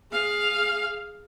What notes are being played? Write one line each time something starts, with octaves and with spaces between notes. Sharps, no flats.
G#4 F5